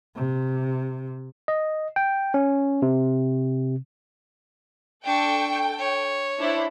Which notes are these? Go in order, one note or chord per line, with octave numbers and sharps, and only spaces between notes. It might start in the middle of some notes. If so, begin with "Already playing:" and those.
C3
D#5
G5
C#4
C3
D4 A4 G5 C#6
C#5
D4 E4 C5